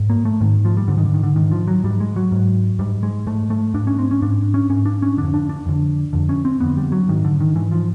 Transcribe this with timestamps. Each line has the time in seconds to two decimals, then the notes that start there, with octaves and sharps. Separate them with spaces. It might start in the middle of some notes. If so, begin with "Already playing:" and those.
Already playing: G#2
0.10 A#3
0.25 A3
0.41 G#2 D#3
0.65 F3
0.77 G3
0.88 G#2 D3
0.98 D#3
1.05 D3
1.14 D#3
1.23 D3
1.36 G#2 D#3
1.52 F3
1.67 F#3
1.83 G#2 G3
2.00 G#3
2.16 F#3
2.32 G#2
2.79 G#2 G3
3.03 G#3
3.27 G#2 A3
3.50 A3
3.74 G#2 D4
3.87 C#4
3.99 C4
4.11 C#4
4.22 G#2 D4
4.54 C#4
4.69 G#2 C#4
4.86 D4
5.02 C#4
5.17 F2 D3 D4
5.34 D4
5.49 D4
5.66 F2 D3
6.13 F2 D3
6.29 C#4
6.45 C4
6.60 F2 D3 B3
6.77 G3
6.92 F#3
7.08 G#2 D#3
7.24 D3
7.40 D#3
7.56 G#2 E3
7.71 F3